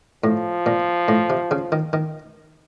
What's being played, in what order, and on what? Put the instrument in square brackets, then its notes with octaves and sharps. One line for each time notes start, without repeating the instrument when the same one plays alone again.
[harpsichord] A2 [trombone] F3
[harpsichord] A#2
A2
C3
C#3
D#3
D#3